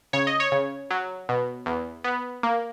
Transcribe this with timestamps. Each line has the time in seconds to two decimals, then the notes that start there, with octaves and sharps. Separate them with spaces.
0.13 C#3 C#5
0.27 D#5
0.40 C#5
0.52 C#3
0.90 F#3
1.29 B2
1.66 E2
2.04 B3
2.43 A#3